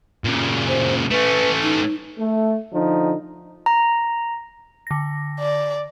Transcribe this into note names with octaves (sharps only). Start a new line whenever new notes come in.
A#2 C#3
C5
A3 C#4 B4
D#4
A3
D3 F3 D#4
A#5
D3 A#6
D5